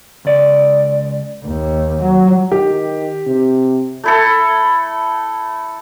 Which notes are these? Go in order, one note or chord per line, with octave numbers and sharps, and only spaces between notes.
C#2 D5
D#2
F#3
D#3 G4
C3
A3 E4 A4